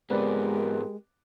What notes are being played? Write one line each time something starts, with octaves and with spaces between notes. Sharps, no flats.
G#2 G#3 B3 C4 G4 A#4 B4 D5